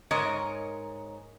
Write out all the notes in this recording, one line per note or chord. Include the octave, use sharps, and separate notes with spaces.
G#2 A#4 C#5 D#5